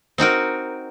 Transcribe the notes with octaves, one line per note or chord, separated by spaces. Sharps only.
C4 D#4 F#4 A#4